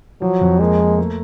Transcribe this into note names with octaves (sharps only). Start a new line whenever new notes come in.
F3 F#3
F2
G#3 A#3
A#3
A3